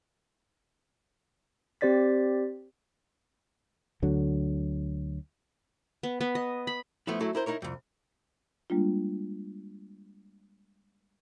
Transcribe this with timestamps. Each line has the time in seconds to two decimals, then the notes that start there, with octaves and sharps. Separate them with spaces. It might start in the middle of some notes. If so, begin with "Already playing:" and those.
1.81 C4 G4 C5 D5 A6 B6
4.02 D2 D3 F#3
6.03 B3
6.21 B3
6.35 D#5
6.67 B5
7.07 F3 A3 B3 E4
7.20 F#3 A3 E4 A4
7.35 E4 A#4 C5
7.46 D#4 E4 A#4 C#5
7.62 C2 F2
8.70 G3 G#3 A#3 D4 F4